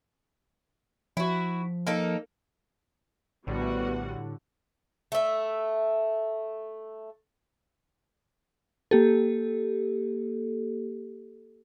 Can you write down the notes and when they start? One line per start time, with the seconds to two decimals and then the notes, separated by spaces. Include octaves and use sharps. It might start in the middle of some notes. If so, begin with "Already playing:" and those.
1.17 F3 E4 F#4
1.87 A#3 D#4 A4
3.47 A#1 A2 D3 G3 B3 F#4 F#5
5.12 A3 E5
8.91 A#3 G4 A4